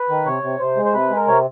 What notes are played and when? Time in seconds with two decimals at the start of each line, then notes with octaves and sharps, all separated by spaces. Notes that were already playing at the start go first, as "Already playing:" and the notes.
Already playing: B4
0.09 D#3
0.25 C3 C#5
0.43 C3
0.60 C3 C5
0.76 G#3
0.85 C5
0.93 C3 B4
1.10 G#3
1.16 A#4
1.27 C3 C#5